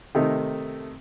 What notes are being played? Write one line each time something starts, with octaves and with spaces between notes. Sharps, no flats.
C3 D#3 A3 D#4